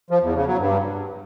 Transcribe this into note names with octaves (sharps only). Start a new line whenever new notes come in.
F3
E2
C#3
F#3
G2